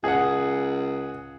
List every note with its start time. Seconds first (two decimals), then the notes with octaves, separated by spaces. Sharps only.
0.04 C#2 G#4 F#5